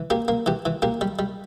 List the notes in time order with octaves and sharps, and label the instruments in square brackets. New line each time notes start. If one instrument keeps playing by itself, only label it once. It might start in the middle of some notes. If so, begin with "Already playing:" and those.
Already playing: [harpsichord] E3
A#3 G4
A#3
E3 G4
E3
A#3 G4
G3
G3